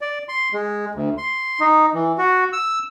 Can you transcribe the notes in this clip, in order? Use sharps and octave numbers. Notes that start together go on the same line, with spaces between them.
D5
C6
G#3
D2
C6
D#4
E3
F#4
E6